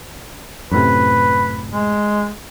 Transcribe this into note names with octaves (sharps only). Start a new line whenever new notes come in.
F#2 A2 C3 B4
G#3